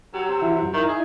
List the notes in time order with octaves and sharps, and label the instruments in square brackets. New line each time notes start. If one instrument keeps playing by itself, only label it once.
[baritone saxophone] F#3 [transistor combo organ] G4 E6
[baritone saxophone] C3
[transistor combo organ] E3 E4 F#4
F#2
[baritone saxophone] D#3 [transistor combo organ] D#4 E4
[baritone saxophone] G#4